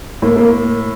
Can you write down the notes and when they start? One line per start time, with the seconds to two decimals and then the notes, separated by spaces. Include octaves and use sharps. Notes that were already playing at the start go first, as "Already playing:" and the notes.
0.22 A2 A#3
0.36 A#3